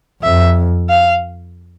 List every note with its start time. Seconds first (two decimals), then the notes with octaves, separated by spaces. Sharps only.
0.23 F2 E5
0.90 F5